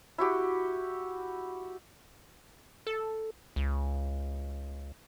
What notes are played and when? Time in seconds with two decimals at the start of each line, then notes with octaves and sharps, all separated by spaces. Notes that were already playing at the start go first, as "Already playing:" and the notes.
0.18 E4 F#4 G4
2.87 A4
3.56 C#2